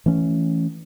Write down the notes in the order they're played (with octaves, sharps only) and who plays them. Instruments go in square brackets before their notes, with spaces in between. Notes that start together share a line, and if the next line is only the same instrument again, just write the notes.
[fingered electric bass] E3 A3 C#4